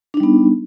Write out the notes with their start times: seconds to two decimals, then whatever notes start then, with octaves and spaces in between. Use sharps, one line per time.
0.14 D4
0.17 D#4
0.20 G3
0.23 B3